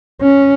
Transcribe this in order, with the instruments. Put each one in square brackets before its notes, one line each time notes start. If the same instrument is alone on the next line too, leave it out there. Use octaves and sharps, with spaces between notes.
[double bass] C#4